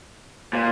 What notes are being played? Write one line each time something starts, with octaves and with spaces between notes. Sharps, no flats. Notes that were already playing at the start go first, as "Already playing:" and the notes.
A#2